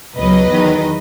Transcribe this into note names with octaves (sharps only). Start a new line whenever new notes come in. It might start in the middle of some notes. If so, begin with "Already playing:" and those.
C#2 B2 F#3 B4 D#5
E2 D#3 F#3